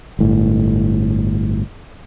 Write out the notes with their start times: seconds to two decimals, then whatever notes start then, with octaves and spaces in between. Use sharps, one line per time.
0.19 G1 A2